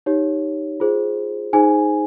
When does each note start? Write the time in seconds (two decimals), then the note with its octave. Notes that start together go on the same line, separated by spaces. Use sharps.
0.06 D#4 G4 C#5
0.80 F4 G#4 C5
1.53 D#4 G#4 C5 G#5